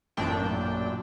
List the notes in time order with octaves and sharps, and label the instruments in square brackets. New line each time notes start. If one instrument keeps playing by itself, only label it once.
[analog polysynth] A1 F#2 A#2 D4 G5